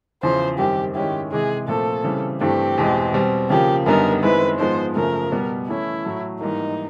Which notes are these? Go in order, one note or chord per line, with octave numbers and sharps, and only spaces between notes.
E2 C#3 F3 C5
F#2 D#3 G3 C4 G4
G#2 D#3 G#3 C#4 E4 G4
C3 E3 G#3 G#4
A#2 F3 A3 C4 A4
C#3 E3 G3 C4
G2 E3 A3 C4 G4
E2 B2 G#3 C4
B2 G3 C4
C#3 F3 A#3 G4
F#2 D3 G3 B3 D#4 A#4
F#2 D#3 G#3 C4 E4 B4
G#2 F3 G#3 B3 C5
F#2 C#3 F3 A3 A#4
B2 G3 B3
E3 A3 C#4 E4
A2 F#3 A3
G#2 E3 G3 A#3 D#4